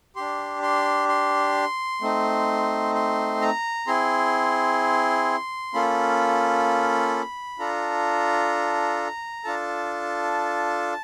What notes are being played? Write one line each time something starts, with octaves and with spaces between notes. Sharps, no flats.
D4 G4 C6
C6
C6
A3 C4 D#4
C6
A#5
C4 E4 G#4 C6
A#3 C#4 F4 A4 B5
D4 F4 A4 A#5
D4 F4 A4 A5